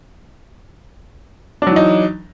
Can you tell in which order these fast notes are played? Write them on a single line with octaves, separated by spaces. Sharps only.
D4 F#3 E3 D#4